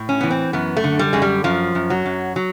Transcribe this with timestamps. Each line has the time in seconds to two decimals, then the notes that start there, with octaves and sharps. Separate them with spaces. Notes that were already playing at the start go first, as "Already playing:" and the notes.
Already playing: A2
0.09 C#4
0.21 E3 B3
0.30 C4
0.53 F#2 B3
0.77 A3
0.84 D3
0.99 G3
1.13 F#2 G#3
1.22 G3
1.44 F#2 F3
1.75 F#2
1.90 F#3
2.06 F#2
2.36 F#3